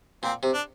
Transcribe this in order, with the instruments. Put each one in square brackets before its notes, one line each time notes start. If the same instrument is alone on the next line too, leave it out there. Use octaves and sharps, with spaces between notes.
[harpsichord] A#2 [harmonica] C4
[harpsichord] C3
[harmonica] D4